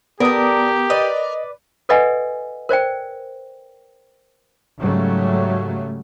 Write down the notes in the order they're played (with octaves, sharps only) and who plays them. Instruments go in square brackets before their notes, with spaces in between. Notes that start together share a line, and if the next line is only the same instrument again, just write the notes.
[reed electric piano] B3 D#6 [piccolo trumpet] G4 [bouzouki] A4 D5 [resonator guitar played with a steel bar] A#4
[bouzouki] B4 D5 [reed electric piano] D#5
[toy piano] A4 B4 D5 D#5 F#5 G#5
A#4 C5 D5 G5
[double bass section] G#2 C#3 F#3 G3 A3